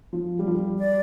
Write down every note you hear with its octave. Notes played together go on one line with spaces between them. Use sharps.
F3
G3
F3
G3
D5